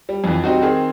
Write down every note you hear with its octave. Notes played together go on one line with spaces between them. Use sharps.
G3
F2 E3
G3 C4 D#4 F#4
D#3 C4 G#4